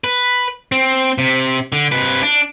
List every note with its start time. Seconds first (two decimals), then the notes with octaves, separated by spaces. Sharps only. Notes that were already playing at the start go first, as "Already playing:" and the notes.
0.04 B4
0.72 C4
1.18 C3
1.72 D3
1.92 C3 B4
2.23 D4